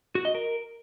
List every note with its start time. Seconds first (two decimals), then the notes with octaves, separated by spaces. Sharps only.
0.15 F#4
0.25 D#5
0.35 A#4